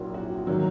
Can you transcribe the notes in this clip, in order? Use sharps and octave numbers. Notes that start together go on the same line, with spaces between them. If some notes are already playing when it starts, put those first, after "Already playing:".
Already playing: A#1 A#2 F#3 E4 F#4
F#4
D#3 F#3